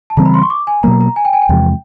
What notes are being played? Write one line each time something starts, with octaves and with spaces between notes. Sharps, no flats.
A5
C#3 E3 G3 C4 A#5
B5
C6
C#6
D6
G#5
B2 F#3 A#3 A#5
A#5
G#5
G5
G#5
G5
E2 C3 F3 G#3